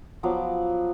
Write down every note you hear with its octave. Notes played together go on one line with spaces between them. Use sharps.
F3 F#3 B3 D6